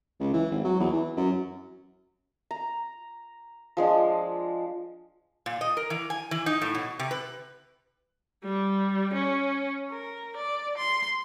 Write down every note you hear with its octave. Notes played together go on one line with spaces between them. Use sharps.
C#2
E3
G#1
F#3
E2
E3
F#2
A#5
F3 G#3 D4
A#2
D#5
A#4
E3
G#5
E3
D#4
A2
B2
C3
B4
G3
C#4
A#4
D5
C6